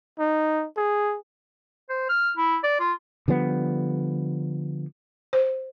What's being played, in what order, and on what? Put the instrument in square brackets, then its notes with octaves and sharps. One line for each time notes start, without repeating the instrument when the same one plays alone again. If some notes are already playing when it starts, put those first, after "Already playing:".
[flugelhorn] D#4
G#4
[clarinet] C5
F6
E4
D5
F4
[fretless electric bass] D3 F3 G3 B3
[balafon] C5